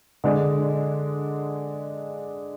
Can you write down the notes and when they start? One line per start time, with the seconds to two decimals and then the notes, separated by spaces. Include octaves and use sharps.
0.24 D3 G#3 D4